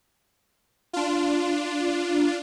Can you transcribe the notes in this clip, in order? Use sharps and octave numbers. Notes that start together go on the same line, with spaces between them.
D4 F4